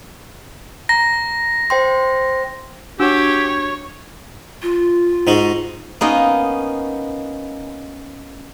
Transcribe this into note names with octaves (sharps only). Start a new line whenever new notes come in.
A#5 A#6
C5 G5 C6
D4 F#4 G4 C#5 E6
F4
G#2 D#4 F#4
A#3 B3 C#4 D#4 D#5